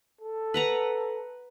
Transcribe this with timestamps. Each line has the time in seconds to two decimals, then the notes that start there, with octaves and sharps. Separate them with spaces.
0.21 A4
0.54 B4 F#5 A#5